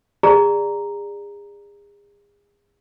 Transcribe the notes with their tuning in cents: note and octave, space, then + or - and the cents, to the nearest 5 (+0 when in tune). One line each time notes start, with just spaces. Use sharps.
G#4 -35 D5 +0 A#5 +0